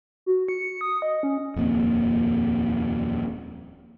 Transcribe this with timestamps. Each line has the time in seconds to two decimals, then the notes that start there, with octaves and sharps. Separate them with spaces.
0.26 F#4
0.49 C#7
0.81 D#6
1.02 D#5
1.23 C#4
1.56 D#1 F2 A#3 C4